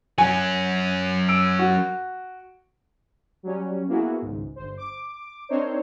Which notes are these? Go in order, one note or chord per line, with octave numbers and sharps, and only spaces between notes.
F#3 C#4 G#5
E6 D7
F#4
F#3 G3 C#4
A#3 B3 E4 F#4 G#4
G#1 C#2 G#2
G1 C5
D6
C4 D4 D#4 A#4 C5 C#5